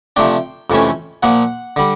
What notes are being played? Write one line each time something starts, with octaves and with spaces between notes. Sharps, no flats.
C3 F3 A3 D4 G5
F2 C3 E3 A3 C#4
A#2 F3 A#3 F#5
D3 G3